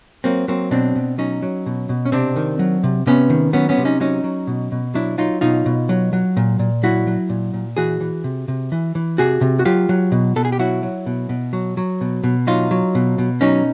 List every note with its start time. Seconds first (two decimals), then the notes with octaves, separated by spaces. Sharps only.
0.24 F#3 A#3 C4
0.48 F#3 A#3 C4
0.71 B2 C4 D4
0.95 B2
1.18 F#3 C#4 D#4
1.42 F#3
1.66 B2
1.89 B2
2.05 C#4
2.12 C3 C4 D4
2.36 D#3
2.59 F#3
2.84 C3
3.06 C3 B3 C#4
3.30 D#3
3.53 F#3 B3 C#4
3.69 B3 C#4
3.78 C3
3.85 C#4 D#4
4.00 F#3 C#4 D#4
4.24 F#3
4.47 B2
4.72 B2
4.94 F#3 D4 E4
5.18 F#3 D#4 F4
5.41 B2 D#4 F4
5.66 B2
5.89 F#3
6.13 F#3
6.37 A#2
6.59 A#2
6.83 F#3 E4 F#4
7.07 F#3
7.29 A#2
7.53 A#2
7.77 E3 F#4 G#4
8.01 E3
8.24 C3
8.48 C3
8.72 E3
8.95 E3
9.18 C3 F#4 G#4
9.41 C3
9.59 F#4
9.65 F#3 F4 G4
9.89 F#3
10.12 B2
10.36 B2 A4
10.45 G#4
10.52 G4
10.59 F#3 E4 F#4
10.83 F#3
11.06 B2
11.29 B2
11.53 F#3
11.77 F#3
12.01 B2
12.24 B2
12.47 F#3 D#4 F4
12.71 F#3
12.95 B2
13.18 B2
13.41 F#3 C#4 D#4